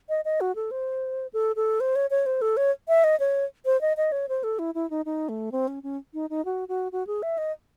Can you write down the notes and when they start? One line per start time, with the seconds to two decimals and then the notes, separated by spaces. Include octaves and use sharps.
0.09 D#5
0.25 D#5
0.41 F#4
0.56 A4
0.71 C5
1.33 A4
1.56 A4
1.80 C5
1.96 C#5
2.10 C#5
2.26 C5
2.42 A4
2.57 C#5
2.88 E5
3.04 D#5
3.20 C#5
3.65 C5
3.81 D#5
3.97 D#5
4.12 C#5
4.29 C5
4.44 A4
4.59 E4
4.75 E4
4.90 D#4
5.06 D#4
5.29 A3
5.52 C4
5.68 C#4
5.83 C#4
6.14 D#4
6.30 D#4
6.45 F#4
6.69 F#4
6.92 F#4
7.07 G#4
7.23 E5
7.38 D#5